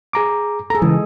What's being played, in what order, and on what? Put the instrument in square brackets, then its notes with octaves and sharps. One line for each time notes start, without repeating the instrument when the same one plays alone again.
[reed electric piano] G#4 A#5 D6
[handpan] G#4 A4 [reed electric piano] A#5
[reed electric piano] C#3 [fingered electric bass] E3 [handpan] G#3